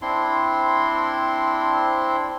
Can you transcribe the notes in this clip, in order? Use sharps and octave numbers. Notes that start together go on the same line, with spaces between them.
C4 D4 E4 C6